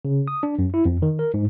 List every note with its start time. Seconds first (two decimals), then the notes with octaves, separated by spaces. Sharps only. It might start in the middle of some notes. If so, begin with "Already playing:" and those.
0.05 C#3
0.28 D#6
0.43 D4
0.59 F#2
0.74 E4
0.85 F2
1.02 D#3
1.19 A#4
1.34 G#2